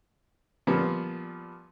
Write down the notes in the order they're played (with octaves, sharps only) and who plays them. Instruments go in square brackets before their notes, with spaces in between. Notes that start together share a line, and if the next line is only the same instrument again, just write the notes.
[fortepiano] A#2 F3 G3 B3